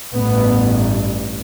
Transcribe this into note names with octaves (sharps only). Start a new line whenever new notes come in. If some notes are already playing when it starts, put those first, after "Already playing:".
A1 G2 B3